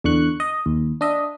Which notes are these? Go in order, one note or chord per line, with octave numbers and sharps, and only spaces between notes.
E2 D3 C#6 F#6
D#5
D#2
D4 D#5 E5